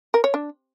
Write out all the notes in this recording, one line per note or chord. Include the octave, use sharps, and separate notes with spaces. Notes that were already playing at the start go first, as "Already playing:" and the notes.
A#4
C#5
D4